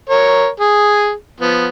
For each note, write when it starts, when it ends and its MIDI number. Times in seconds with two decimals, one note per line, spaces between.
0.10 0.48 70
0.10 0.48 73
0.60 1.11 68
1.41 1.68 53
1.41 1.68 59